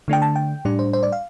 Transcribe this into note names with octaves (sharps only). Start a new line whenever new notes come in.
D3 A3 D4 G5
A5
G5
A2 G3 D4 D5
C5
C5
D5
F5